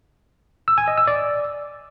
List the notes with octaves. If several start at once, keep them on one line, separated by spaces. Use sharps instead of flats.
E6
G#5
D#5
E6
D5